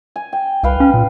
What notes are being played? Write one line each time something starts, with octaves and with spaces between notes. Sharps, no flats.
G#5
G5
C2 B4 F5 G5
C#4
A#2